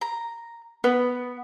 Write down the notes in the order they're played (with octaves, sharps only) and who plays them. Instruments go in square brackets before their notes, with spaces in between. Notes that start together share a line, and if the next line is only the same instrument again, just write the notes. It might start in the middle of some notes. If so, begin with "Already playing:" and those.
[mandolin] A#5
[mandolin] B3 [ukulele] B4